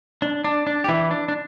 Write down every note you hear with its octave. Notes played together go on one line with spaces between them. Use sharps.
D4
D4
D4
G4
E3 E4
D4
D4